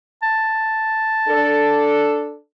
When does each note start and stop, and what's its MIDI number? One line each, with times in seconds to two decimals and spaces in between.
0.23 1.96 81
1.29 2.37 62
1.29 2.37 69